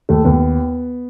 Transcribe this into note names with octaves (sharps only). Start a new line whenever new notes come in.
D#2 A3
D#2 B3